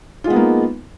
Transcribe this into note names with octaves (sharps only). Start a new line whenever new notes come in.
G#3 A#3 B3 D#4 F4